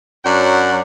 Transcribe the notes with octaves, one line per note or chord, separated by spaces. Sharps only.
F#2 F#3 D4 F#5